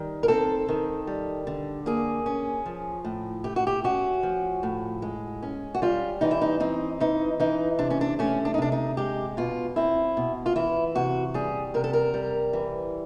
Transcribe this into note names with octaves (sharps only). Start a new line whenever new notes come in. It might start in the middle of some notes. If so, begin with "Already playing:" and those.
Already playing: D#3 G3
A#4
C4 A4
D#3
G3
D3
A#3 G#4
C#4
F3
A2
A3 G4
F#4
G4
C#4 F#4
F3
A2
G#3
C#4
F#4
G3 F4
E3 D#4
E4
D#4
C4 D#4
E3 D#4
E3 D#4
C3 D4
C#4
D4
A3 C#4
D4
D#4
C3 D4
D#4
G#3 G4
B2 F4
C4 E4
B2
F4
E3 E4
C3 F#4
G3 G#4
C3 A#4
A4
A#4
G3
E3